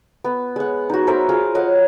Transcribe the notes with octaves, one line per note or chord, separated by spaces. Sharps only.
B3
G#3 F#5
D#4 F#4
A#4 C5 E5
F4 G#4 F5 D#6
C#5 D#5 F5 F#5